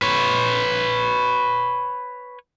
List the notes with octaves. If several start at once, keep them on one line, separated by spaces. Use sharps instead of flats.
B4 C#5